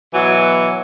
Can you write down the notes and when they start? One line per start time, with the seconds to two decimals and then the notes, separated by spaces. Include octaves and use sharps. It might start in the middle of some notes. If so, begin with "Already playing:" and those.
0.13 B2 E3 F#3